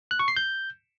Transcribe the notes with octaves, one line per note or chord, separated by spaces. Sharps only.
F#6
C#6
C7
G6